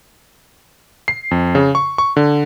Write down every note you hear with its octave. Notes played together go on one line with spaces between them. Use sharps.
C7
F2
C#3
C#6
C#6
D3